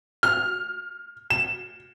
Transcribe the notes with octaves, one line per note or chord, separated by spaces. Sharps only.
F6
E7